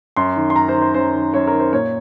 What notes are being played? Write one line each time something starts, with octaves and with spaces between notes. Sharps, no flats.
F#2 C6
D#3
C6
F#2 A#5
C5
D#3
C5
F#2 C5
D#3
F#2 C#5
A#4
D#3
C5
A#2 C#5